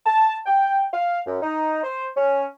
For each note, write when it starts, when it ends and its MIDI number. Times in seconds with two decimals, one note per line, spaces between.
0.06 0.37 81
0.46 0.84 79
0.93 1.19 77
1.27 1.38 42
1.42 1.80 63
1.83 2.07 72
2.15 2.45 61